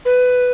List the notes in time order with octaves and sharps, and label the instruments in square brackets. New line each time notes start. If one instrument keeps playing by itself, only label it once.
[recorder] B4